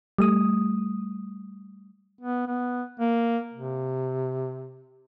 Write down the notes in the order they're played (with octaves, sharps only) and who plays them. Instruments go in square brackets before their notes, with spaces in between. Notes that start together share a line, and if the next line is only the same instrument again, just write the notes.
[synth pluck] G3 A3 D#6
[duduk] B3
B3
A#3
C3